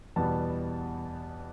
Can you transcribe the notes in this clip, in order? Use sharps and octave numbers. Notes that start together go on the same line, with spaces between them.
E2 B2 G3 B3 A5